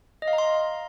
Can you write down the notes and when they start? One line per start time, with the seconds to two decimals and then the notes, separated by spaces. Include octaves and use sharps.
0.22 D#5
0.28 F5
0.33 A#5
0.38 C6